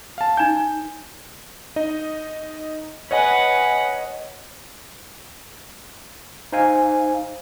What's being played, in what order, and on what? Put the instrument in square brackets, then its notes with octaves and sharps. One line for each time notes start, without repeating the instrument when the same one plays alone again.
[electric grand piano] F5 A5
[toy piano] D#4 G#5 [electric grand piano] G6 E7
[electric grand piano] D#4 D#5
[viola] B4 F#5 [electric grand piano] C#5 D#5 G#5
[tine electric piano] D#4 C5 F5 G#5